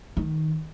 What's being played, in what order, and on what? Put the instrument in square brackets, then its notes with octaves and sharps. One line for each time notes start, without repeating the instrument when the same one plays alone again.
[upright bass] D#3